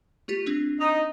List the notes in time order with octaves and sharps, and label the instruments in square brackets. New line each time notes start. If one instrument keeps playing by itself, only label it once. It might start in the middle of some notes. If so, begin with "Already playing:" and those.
[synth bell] A3 F4 G4
C4 D4
[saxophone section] D#4